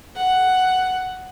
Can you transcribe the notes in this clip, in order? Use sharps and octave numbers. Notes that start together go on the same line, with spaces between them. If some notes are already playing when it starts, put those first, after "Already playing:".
F#5